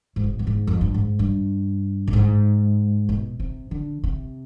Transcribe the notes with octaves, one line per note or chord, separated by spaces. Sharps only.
G#2
B2
G2
G#2
F2
G2
G#2
G2
B2
G#2
B2
C3
D3
C3